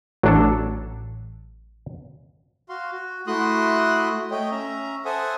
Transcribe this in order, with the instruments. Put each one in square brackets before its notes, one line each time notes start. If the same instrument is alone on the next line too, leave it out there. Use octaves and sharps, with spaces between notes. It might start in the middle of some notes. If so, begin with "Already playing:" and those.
[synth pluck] A1 [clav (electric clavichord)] F#3 D4 A4
[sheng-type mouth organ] F#4 F5 C6
F#4
A3 E4 F#4 C6 D#6 F#6
A3 C#5 D#5 G5
C#4 E5 A#5
A4 C5 E5 F#5 G#5 D#6